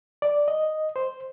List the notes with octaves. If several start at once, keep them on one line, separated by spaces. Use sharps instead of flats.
D5
D#5
C5